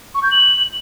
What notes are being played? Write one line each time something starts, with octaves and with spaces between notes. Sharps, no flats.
C#6
G6
F#7